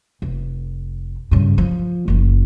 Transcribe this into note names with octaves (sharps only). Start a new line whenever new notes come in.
F1
G2 C#3
F3
F#1 F4